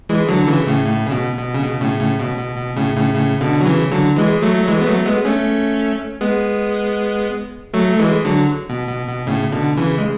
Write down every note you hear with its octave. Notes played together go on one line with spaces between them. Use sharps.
E3 G#3
D3 F#3
D3
C#3 E3
A2 C#3
A2
C#3
B2
B2
C#3
B2
A2 C#3
A2 C#3
B2
B2
B2
A2 C#3
A2 C#3
A2 C#3
B2 D3
F#3
C#3 E3
D3 F#3
E3 G#3
F#3 A3
F#3
E3 G#3
B3
F#3 A3
G#3 B3
A3 C#4
G#3 B3
F#3 A3
A3
E3 G#3
D3 F#3
B2
B2
B2
A2 C#3
B2 D3
C#3 E3
G#3